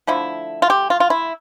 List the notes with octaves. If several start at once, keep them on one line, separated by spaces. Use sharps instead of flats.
D3 F3 A3 E4
F4
G4
F4
F4
E4